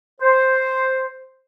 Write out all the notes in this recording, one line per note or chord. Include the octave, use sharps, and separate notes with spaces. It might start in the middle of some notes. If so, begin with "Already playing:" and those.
C5